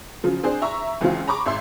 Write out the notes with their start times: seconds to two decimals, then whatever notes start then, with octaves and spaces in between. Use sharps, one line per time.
0.23 C#3 F3 F#3
0.43 C4 D4 G#4 C5
0.62 E5 A#5 C#6
1.01 C#2 E3 C4 E4 F4
1.28 A#5 B5 C#6 D6
1.46 G#1 E5 C6